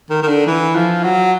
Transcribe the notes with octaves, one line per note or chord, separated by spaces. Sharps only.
D#3
D#3
D3
E3
F3
F#3